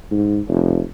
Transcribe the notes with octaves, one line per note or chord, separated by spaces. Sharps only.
G#2
F1